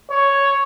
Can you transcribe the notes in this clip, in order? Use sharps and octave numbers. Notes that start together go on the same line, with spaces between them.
C#5